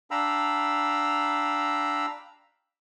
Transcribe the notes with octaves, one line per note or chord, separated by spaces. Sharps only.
D4 F5 G5 A#5 B5 E6